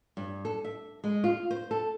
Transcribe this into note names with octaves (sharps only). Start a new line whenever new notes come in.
G2
A4
E5
G#3
F4
C5
A4